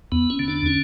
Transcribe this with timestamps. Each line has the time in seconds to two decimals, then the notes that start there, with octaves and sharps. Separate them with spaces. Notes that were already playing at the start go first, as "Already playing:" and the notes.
0.12 E2 B3
0.30 C#4
0.39 D3
0.48 D4
0.66 C#4